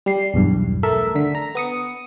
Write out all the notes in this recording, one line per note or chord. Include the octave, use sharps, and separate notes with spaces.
G3 C7
B1 E2 G2
A3 A4 A#4 E5
D3 B6
A#5
B3 D#6 C#7